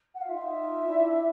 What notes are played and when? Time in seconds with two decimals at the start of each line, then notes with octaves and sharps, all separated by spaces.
0.14 F#5
0.21 F5
0.28 D#4 F4 E5
0.87 D4 E4